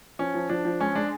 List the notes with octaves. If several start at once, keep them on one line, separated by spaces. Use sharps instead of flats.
F3 C#4
F3
F3 D4
F3
G#3 C#4
G#3 D4